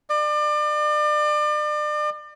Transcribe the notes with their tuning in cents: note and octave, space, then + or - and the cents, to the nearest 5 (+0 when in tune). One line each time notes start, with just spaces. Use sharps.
D5 +35